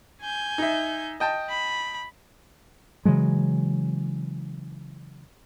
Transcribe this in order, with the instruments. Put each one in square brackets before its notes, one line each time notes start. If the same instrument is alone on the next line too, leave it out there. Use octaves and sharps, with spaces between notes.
[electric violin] G#5 G6
[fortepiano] D#4 E5
D#5 G5 A5
[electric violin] B5
[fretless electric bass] C#3 E3 F#3 G#3